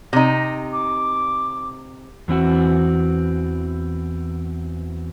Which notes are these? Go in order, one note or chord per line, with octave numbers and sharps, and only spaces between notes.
C3 D#4 A#6
D6
E2 E3 C4 F#4